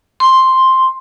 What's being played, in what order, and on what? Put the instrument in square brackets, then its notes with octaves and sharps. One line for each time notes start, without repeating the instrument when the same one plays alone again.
[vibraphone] C6